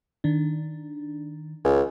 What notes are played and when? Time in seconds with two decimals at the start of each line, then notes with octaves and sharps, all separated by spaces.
0.24 D#3 D4
1.65 C#2 G#5